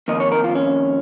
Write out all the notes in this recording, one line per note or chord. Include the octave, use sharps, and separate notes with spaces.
F2 D#3 A#3 D#5
C#5
A#4
F4
C#4